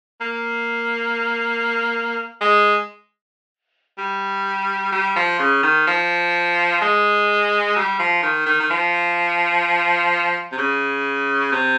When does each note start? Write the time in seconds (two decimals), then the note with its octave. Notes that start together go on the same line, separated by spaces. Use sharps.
0.21 A#3
2.41 G#3
3.98 G3
4.92 G3
5.16 F3
5.39 C#3
5.63 D#3
5.87 F3
6.82 G#3
7.76 G3
7.99 F3
8.23 D#3
8.46 D#3
8.60 D#3
8.70 F3
10.52 C3
10.58 C#3
11.52 C3